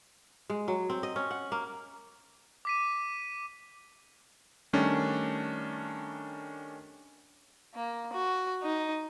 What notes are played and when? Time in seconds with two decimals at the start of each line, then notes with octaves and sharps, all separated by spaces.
0.50 G#3
0.68 F#3
0.90 C4
1.03 D#5
1.16 C#4
1.31 F#5
1.52 A#3
2.65 D6 B6 D#7
4.73 D#3 G3 A3 C#4 D4
7.75 A#3
8.13 F#4
8.62 D#4